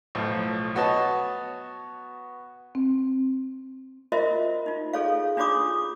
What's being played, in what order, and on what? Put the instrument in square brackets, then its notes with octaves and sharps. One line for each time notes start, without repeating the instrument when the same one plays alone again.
[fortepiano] B1 A2 F3
B3 F#4 C#5 D#5 A5
[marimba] C4
[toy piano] F4 F#4 A#4 C5 D#5 E5
D#4 F4
G#4 A4 C#5 F5
D4 F4 F#4 C#5 D6 D#6